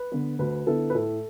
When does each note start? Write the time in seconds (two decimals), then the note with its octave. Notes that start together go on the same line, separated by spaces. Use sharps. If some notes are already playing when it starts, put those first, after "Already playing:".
Already playing: B4
0.12 D3 B3
0.39 D2 B4
0.67 D3 B3 E4 A4
0.90 B4
0.95 A2 A4